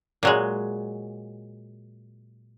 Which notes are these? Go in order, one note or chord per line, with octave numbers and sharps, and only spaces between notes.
A#2 F#3 G#3